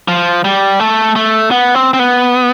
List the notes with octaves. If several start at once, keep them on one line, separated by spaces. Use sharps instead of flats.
F3
G3
A3
A3
B3
C4
C4
B3